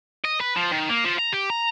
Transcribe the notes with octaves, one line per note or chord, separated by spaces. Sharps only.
D#5
B4
F3
D#3
A#3
F3
A#5
G4
A#5